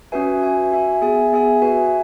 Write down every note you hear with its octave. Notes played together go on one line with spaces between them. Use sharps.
C#4 F#4 B4 E5 G#5
F#4 E5 G#5
F#4 E5 G#5
B3 G#4 E5 G#5
B3 G#4 E5 G#5
F#4 B4 E5 G#5